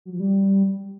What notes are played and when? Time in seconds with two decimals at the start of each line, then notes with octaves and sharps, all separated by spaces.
0.05 F#3
0.12 F3
0.20 G3